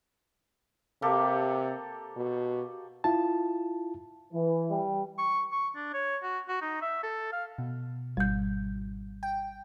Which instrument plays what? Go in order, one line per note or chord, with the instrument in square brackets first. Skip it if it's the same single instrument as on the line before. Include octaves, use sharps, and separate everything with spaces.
[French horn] C3 [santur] A#3 G4 A4
[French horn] B2
[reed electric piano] E4 F4 A5
[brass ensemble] E3
[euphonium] G3
[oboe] C#6
C#6
D4
C#5
F#4
F#4
D#4
E5
A4
F5
[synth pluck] B2
[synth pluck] G#1 [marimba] G3 G6
[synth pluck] G5